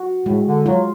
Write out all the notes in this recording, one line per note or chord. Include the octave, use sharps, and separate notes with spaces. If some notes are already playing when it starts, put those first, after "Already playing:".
Already playing: F#4
A2 G#3
D3
F#3 F4